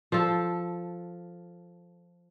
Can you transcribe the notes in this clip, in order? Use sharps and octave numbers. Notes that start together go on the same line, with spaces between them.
F3 A4